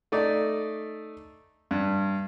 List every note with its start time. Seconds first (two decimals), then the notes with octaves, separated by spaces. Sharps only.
0.12 A3 D#4 D5
1.71 G2